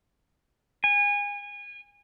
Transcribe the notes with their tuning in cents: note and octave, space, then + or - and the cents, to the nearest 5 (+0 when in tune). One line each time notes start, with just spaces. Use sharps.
G#5 -30